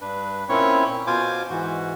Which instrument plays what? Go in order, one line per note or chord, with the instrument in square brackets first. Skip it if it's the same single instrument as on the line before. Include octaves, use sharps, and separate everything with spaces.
[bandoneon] G2 D4 B4
A#2 C4 C#4 E4 C#5 C#6
B2 F4 C5 G#5 D6
G#2 E3 F#4